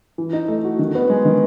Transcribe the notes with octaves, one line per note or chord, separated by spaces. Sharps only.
E3
D#4
A3
F#4
D#3
B3
G#3
D#3